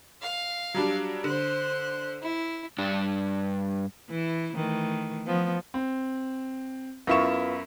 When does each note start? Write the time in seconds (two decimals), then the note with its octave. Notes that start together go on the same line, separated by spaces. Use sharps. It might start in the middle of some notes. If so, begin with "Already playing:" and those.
0.22 F5
0.74 F#3 G3 D4
1.24 D3 C5 F#6
2.22 E4
2.78 G2 D4
4.09 E3 E4
4.54 D#3 E3 A3
5.27 F3 B3
5.74 C4
7.07 F#2 B3 E4 F4 C#6 E7